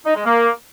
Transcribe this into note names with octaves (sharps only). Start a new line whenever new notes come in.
D#4
G#3
A#3